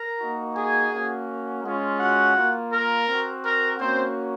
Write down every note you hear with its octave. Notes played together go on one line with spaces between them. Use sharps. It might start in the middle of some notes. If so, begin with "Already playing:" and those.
Already playing: A#4 A#5
A#3 D#4 F#4
G#4 G#5
A#3 C#4 F#4
G#3 C#4 F4
F#4 F#5
A#3 F4
A#4
C4 F#4
A#4
A#3 C4 C#4 F#4 C5